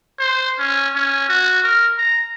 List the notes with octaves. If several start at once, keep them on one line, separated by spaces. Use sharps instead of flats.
C5
C#4
C#4
F#4
A#4
A#5